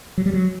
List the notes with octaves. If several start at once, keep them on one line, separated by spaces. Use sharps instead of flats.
F#3
G3
F#3